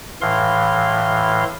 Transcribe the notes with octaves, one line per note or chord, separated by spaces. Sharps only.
A2 E3 F5 C6